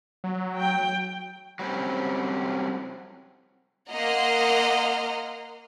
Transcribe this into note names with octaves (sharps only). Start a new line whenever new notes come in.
F#3
G5
F#3 G3 C4 C#4
A#3 D#5 F#5 A#5 C6 F6